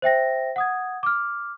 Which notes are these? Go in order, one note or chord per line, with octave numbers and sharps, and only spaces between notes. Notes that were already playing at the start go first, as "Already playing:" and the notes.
C5 E5 G5 A#6
F#5 D#6 G#6
D6 F6